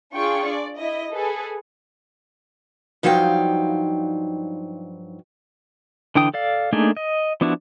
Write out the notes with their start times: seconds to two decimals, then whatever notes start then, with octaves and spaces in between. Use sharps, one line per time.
0.13 D4 F4 G#4 G5 C#6
0.47 D5
0.78 E4 D#5
1.12 G#4 A4 B4
3.03 G2 F3 F#3 D#4 F5 G5
6.15 D3 E3 D4 G5 D#6
6.34 A4 D5 F5
6.73 A3 A#3 D4 D#4 G#4
6.97 D#5
7.41 F3 B3 D4 E4 F#4